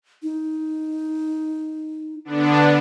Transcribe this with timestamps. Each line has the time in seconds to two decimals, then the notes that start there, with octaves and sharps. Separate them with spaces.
0.23 D#4
2.25 D3 B3 D4